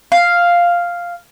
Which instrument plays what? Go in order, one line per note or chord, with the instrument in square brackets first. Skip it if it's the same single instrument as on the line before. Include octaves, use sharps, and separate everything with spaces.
[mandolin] F5